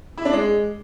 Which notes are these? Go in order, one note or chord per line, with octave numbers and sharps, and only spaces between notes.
E4
D4
G#3